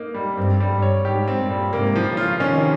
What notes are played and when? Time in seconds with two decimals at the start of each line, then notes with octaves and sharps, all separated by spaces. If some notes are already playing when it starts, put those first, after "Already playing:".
Already playing: A#3 D#4
0.14 G3
0.37 G2 C4
0.60 G3
0.71 G2
0.82 C#5
1.05 G#2 G4
1.28 C4
1.39 G2 A#2
1.50 G3
1.72 G#2 C3 A#3
1.96 F3
2.06 A#2 C#3
2.17 F4
2.40 C3 D#3 C#4